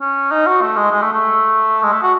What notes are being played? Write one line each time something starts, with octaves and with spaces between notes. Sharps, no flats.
C#4
D#4
F#4
A3
G#3
G#3
A3
A3
G#3
A3
F#4